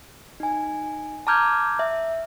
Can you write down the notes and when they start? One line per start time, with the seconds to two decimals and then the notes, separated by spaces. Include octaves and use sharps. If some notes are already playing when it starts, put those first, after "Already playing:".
0.40 D#4 G#5
1.27 A5 A#5 D6 F6 G6 G#6
1.79 E5